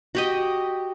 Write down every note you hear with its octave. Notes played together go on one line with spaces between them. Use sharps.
F#4 G4 D#5